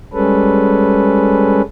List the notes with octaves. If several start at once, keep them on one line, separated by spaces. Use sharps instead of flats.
G3 G#3 C#4 A4 B4